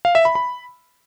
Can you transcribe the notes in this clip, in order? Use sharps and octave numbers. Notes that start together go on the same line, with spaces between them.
F5
E5
B5
B5